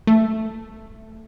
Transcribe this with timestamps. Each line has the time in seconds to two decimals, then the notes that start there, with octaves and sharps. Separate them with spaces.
0.07 A3